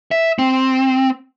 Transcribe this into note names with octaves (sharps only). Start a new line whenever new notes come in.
E5
C4